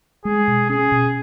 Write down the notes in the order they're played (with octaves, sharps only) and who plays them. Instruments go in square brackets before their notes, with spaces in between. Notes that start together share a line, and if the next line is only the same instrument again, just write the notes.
[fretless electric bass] G#3 [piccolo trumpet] G#4
[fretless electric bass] B2
[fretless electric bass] C#4 [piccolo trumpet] G#4
[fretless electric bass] B2